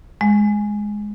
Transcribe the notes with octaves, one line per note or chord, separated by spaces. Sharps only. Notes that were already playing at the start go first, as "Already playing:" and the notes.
G#3